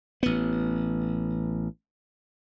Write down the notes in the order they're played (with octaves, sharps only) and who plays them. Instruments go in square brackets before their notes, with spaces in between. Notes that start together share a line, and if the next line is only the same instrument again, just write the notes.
[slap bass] A1 B3